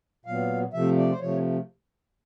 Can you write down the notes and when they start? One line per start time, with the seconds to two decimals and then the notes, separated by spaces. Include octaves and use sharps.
0.26 A#2 F#3 B3 F5
0.73 C3 F3 A3 E5
0.97 D5
1.10 C5
1.20 C3 F3 A3 C#5